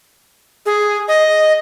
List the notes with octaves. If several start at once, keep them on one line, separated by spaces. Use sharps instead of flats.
G#4
D#5